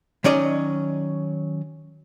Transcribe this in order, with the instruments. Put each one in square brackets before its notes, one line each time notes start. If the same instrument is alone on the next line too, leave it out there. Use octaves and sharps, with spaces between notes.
[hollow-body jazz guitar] D#3 F#3 C#4 D5 D#5